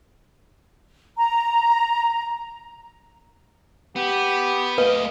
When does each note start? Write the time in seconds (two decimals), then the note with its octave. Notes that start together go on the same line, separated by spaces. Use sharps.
1.17 A#5
3.96 B3 G4
4.78 A3 B4 D#5 F5